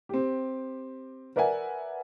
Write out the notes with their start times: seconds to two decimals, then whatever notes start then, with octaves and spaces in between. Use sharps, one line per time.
0.09 C4 G4
1.36 A#4 B4 D5 E5 F#5 G#5